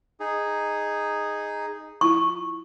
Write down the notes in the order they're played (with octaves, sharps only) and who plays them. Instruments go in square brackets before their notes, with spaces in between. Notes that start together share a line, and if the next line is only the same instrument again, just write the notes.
[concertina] D#4 G#4
[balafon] E4 F4 [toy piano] C#6